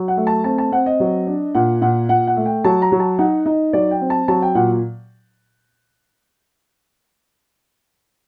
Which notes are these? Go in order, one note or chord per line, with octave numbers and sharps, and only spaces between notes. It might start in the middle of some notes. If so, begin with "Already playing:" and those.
Already playing: F#3
F#5
A3
A5
C4 A5
A5
C4 F#5
D#5
F#3
D4
A#2 F#5
A#2 F#5
A#2 F#5
F#5
A3
G5
F#3 A5
A#5
F#3
A5
D#4 F#5
D#4 D#5
F#3 D5
G5
C4
A5
F#3 A5
G5
A#2 F#5